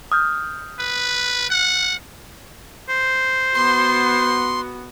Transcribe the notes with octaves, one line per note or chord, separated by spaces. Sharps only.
D#6 F6 G6
B4
F#5
C5
B3 F#4 C6